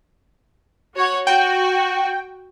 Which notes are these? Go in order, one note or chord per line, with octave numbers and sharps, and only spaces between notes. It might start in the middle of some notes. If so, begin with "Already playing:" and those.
F#4 C#5 F#5
F#4 G5